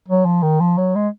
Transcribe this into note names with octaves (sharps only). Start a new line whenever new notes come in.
F#3
F3
D#3
F3
F#3
G#3